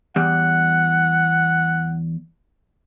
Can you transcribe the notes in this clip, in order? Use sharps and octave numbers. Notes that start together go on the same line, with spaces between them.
E2 G3 F#5